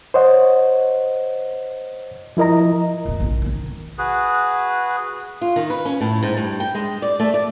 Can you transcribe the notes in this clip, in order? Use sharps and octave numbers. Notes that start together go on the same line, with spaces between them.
C5 C#5 D#5 F#5
F3 E4 A#4 D#5 A#5
F2 A#2
A#1 C#3
D#3 D4
F#4 G#4 B4
F4
D#3
B4
C#4
A2
G#2
G2
G5
G#3
D5
A3
D5